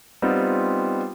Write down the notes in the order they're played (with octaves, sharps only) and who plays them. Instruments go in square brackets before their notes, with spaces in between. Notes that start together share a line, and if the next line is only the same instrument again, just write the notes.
[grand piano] G3 B3 C4 D#4 F4